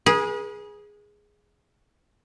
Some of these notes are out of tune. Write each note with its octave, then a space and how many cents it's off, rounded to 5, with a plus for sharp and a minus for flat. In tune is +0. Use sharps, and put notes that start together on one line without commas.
G#4 +0 B4 -40